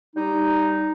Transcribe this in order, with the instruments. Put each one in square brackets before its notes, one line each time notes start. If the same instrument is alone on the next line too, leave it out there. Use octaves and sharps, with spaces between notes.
[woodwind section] G3 D#4